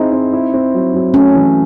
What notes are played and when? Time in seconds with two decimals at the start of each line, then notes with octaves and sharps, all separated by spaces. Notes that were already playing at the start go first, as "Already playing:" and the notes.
Already playing: C4 D#4 E4 G#4
0.12 C4
0.33 E4
0.54 C4
0.74 F#3
0.94 F#3
1.14 A3 C#4
1.35 E3